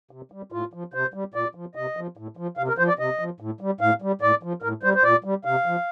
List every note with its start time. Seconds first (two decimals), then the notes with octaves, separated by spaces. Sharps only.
0.11 C3
0.32 G3
0.52 A2 F4
0.73 F3
0.94 C3 C5
1.14 G3
1.34 A#2 D5
1.55 F3
1.75 C3 D#5
1.97 F3
2.17 A2
2.37 F3
2.57 C3 F5
2.68 A#4
2.78 F3 C5
2.88 D5
2.99 C3 D#5
3.19 F3
3.40 A2
3.61 G3
3.81 A2 F5
4.02 G3
4.21 A2 D5
4.43 F3
4.62 A2 A#4
4.83 G3 C5
4.95 C5
5.04 A#2 D5
5.24 G3
5.45 C3 F5
5.66 F3